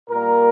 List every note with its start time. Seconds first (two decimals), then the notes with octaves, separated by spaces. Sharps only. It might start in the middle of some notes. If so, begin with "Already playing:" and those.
0.09 A#2 G3 A#3 A#4